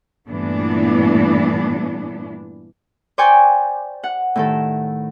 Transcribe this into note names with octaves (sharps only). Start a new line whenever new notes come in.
G2 A#2 E3 A3 B3 D4
C5 D5 G5 G#5 C#6 G6
F#5
A2 D#3 A4